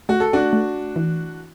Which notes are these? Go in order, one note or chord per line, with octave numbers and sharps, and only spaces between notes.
A3 F#4
A4
D4 F#4
A3
E3